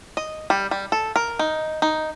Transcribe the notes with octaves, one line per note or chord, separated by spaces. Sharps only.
D#5
G3
G3
A4
A#4
D#4
D#4